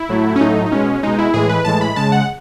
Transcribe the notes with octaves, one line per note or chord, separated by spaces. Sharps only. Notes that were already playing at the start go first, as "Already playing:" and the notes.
Already playing: E4
A2 F#3 A3
C#4
A2 F#3 A3 D#4
D#4
B2 G#3 C#4
B2 G#3 D#4
E4
A2 E3 G#3 G#4
B4
A2 E3 G#3 A5
B5
C#3 G#3 A5
F#5